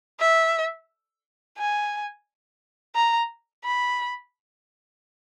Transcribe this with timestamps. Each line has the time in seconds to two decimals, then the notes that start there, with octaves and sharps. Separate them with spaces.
0.19 E5
1.58 G#5
2.95 A#5
3.64 B5